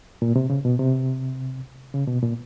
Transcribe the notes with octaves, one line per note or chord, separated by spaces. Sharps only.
A#2
C3
C#3
B2
C3
C#3
B2
A#2